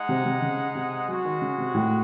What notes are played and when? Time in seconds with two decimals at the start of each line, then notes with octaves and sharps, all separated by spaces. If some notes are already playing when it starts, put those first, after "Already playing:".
Already playing: G#3 D#4 G#4 D#5 F#5
0.09 C3
0.26 C3
0.42 C#3
0.75 C3
1.08 F#3 G#3 C#4 F#4
1.25 D#3
1.42 C#3
1.58 C3
1.74 A2